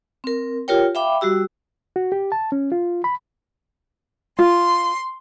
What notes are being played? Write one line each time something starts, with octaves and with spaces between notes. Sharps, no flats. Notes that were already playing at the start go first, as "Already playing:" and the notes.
C4 A#4
F4 G4 A#4 C#5 G5
E5 F5 G5 B5 D6
G3 F#4 G4 E6
F#4
G4
A5
C#4
F4
B5
F4 C6